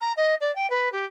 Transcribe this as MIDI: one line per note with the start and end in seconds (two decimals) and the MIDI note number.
0.01 0.13 82
0.17 0.35 75
0.41 0.54 74
0.55 0.69 79
0.70 0.91 71
0.92 1.05 67